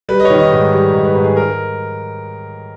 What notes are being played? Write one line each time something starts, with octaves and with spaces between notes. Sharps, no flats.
G3 B4
D#5
C#5
D#3
D#5
G#2
G3
G#2
B4
G#2
G#4
A#4